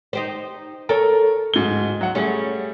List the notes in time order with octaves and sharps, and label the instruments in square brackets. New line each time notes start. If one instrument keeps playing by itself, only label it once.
[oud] D#4 G4 C5
[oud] A4 C#5 [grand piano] A#4
[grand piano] D1 G#2 G7
F#3 F#5
[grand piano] G3 A3 G#4 [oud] C#4